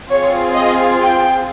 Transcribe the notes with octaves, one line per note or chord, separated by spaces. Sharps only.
C4 F4 G#4 C#5
D#5
G5